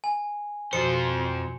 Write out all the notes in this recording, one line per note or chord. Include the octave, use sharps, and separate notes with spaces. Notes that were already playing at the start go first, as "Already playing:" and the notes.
G#5
F2 B2 F3 F#4 C5 C#7